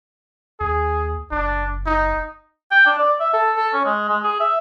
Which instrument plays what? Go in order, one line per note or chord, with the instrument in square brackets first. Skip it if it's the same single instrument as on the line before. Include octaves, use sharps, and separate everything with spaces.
[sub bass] D#2 [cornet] G#4
[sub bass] F#1 [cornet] D4
[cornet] D#4
[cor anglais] G5
D4
D5
E5
A4
A4
C#4
G#3
G#3
G#4
E5